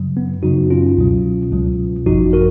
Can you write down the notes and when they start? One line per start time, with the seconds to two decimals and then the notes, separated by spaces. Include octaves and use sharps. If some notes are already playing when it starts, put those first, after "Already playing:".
Already playing: F#2 C#3 F#3
0.17 B3
0.43 F#2 C#3 F#3 D#4 F#4
0.70 C#4 F4
0.97 C#2 B2 F#3
1.52 C#2 B2 F#3
2.06 G#1 F#2 F3 D#4 F#4
2.33 F#4 A#4